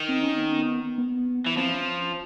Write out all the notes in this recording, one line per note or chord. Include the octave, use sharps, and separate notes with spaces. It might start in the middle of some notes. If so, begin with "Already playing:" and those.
Already playing: D#3
C4
C#4
B3
B3
E3
F3 C4
C#4